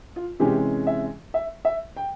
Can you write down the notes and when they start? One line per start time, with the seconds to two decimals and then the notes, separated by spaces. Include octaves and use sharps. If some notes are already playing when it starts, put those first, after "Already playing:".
0.16 F4
0.40 C3 E3 G#3 C#4 G4
0.87 E5
1.34 E5
1.65 E5
1.96 G5